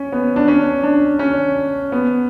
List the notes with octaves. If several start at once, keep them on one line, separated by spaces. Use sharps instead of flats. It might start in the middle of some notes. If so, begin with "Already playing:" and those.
Already playing: C#4
B3
D4
C#4
D4
C#4
B3